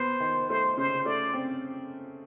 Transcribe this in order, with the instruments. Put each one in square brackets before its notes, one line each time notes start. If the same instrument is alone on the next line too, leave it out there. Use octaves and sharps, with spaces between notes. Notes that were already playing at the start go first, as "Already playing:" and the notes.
Already playing: [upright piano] B3 [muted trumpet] C5
[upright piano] D#3
[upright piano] A3 [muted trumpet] C5
[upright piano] C#3 [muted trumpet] C5
[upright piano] A3 [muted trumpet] D5
[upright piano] C4